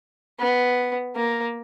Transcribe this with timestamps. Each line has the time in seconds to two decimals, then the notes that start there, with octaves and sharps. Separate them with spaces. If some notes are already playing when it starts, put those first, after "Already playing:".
0.40 B3
1.16 A#3